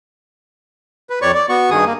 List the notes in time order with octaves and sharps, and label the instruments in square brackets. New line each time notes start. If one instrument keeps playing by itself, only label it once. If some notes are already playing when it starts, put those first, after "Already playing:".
[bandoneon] B4
F2 C#5 D5 C#6
D5
B3 F#4 C#6
G2 D#3 G#4 D#6
A#3